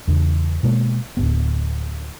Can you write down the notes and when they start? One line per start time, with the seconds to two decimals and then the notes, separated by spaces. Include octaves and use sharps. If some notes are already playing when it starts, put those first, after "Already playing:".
0.08 E2 C#3
0.63 B2 G#3 A#3
1.17 D1 F2 B3